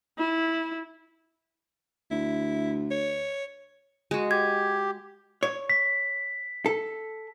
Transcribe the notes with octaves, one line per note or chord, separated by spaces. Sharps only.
E4
D2 E4
C#5
G#3 F#4
G4 G#6
C#5
B6
A4